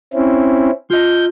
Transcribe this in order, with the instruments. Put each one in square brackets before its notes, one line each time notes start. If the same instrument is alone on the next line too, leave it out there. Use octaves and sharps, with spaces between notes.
[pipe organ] C4 C#4 E4
[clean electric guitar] F4 D#5 [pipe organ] G6